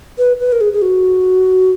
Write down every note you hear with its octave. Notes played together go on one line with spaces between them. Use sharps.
B4
B4
A#4
G#4
G#4
F#4